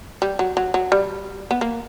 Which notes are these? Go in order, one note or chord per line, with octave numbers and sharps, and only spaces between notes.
G3
F#3
F#3
F#3
G3
B3
A#3